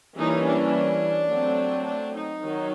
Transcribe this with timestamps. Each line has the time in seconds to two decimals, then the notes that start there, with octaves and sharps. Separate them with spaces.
0.16 E3 G3 A#3 C#4 D#4
0.45 D4
1.29 F#3 A3 C4
1.85 D4
2.14 D#4
2.41 D#3 F#3